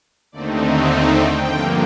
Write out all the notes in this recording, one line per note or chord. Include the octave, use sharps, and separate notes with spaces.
D#2 D3 A3 C4 D#4 D5
D#5
F5
G5
G2 D3 F3 A#3